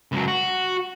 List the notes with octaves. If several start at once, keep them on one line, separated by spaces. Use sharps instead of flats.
C#2 F#3
F#4